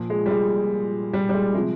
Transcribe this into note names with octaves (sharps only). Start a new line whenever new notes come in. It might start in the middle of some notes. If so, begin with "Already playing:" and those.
Already playing: A#2 F3
G#3
G3
G#3
G3
G3
G#3
C3 F3 G#3